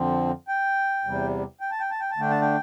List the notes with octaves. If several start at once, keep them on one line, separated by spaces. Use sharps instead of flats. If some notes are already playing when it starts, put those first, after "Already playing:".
Already playing: F2 D3 F3 C4
G5
E2 C3 G3
G5
A5
G5
A5
G5
A5
D3 A3 D4 G5
A5
G5